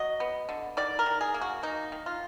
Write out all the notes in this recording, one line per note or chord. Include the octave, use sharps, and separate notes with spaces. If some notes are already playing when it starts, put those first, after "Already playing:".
Already playing: F#3 D#5
B3
D3
D#3 D5
A#4
D#3
G#4
A#3
F#4
A#3 D#4
D#3
F4